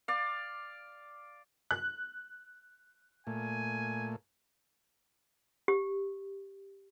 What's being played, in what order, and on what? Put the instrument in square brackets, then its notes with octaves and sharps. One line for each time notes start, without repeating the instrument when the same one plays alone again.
[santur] D5 F5
[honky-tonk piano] F#6
[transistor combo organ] A#2 A3 [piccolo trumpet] G#5
[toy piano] G4